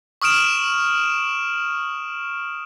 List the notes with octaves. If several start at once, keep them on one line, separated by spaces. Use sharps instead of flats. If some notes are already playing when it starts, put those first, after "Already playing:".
C#6 D#6 F6 D7 E7